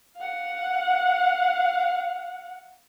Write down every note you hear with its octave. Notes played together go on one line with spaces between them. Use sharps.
F5 F#5